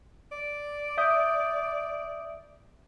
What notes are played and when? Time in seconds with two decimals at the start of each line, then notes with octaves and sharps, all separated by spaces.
0.32 D5
0.98 E5 D#6 G6